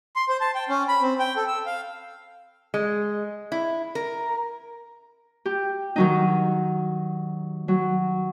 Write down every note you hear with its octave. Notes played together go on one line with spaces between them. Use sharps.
C6
C5
A5
G5
C#4
B5
C4
G5
A4
E6
F5
G#3
E4
A#4
G4
D#3 F#3 D#4
F#3